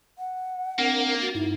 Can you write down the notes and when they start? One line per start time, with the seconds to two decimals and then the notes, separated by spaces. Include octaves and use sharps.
0.18 F#5
0.78 A#3 C4 D4 A#4
1.21 F#4 A6
1.35 G2 D#4 E4